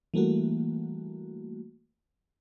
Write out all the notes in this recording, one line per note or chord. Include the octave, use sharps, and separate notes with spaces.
E3 G3 A3 A#3 F#4